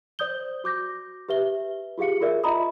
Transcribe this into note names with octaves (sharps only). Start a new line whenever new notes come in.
C5 D5 D#6 G6 G7
F#4 D6 G6 A#6
G4 B4 E5 G7
F4 G4 G#4 F5 C#7
F4 G#4 A#4 D5 E5
F4 D#5 E5 A#5 B5 D#6